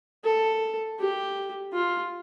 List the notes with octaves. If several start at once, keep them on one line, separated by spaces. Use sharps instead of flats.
A4
G4
F4